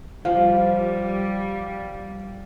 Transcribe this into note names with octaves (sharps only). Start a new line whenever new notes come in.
F3 G3 F5